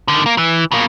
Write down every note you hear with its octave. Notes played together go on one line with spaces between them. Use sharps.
D3 D#3
A#3
E3
B2 A#3